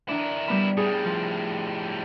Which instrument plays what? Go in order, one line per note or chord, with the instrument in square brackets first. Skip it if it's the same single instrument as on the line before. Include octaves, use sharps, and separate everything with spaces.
[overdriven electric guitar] D#3 E4 [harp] D4
[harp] G3 B3 B5
[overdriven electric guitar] A2 G3 [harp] G#4
[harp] F3